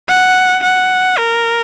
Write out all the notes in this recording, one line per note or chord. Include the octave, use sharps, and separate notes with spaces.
F#5
F#5
A#4